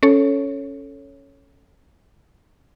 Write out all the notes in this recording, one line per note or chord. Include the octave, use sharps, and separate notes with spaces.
C#4 A4 C#5